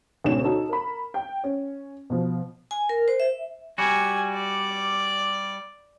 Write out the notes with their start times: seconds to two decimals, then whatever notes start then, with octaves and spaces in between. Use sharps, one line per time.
0.24 D2 G#2 B2 C#4 D4 E7
0.44 D#4 F#4 A4 C#5
0.69 A#4 B5
1.14 G5
1.44 C#4
2.10 B2 F3
2.71 G#5
2.89 A#4
3.08 C5
3.20 E5
3.78 G3 F#4 G#5
4.34 D5